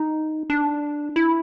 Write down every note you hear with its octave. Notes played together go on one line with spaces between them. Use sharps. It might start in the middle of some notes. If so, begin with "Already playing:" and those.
Already playing: D#4
D4
E4